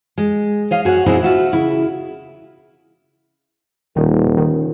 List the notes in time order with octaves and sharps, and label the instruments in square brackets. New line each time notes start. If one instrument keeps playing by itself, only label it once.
[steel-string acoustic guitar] G#3
C#5 D#5 F5
F#4 G#4 C#5 F#5
B2 C4 D#4 E4 F#4 G#4
F4 F#4 E5
C#3 E4
[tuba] D#1 [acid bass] D#3
[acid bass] D#3